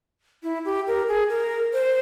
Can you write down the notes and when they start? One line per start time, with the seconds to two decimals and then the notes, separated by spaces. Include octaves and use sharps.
0.43 E4
0.65 G4
0.87 A#4
1.08 G#4
1.30 A#4
1.73 C5